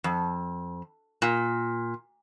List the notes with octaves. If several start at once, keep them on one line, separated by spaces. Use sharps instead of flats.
F2
A#2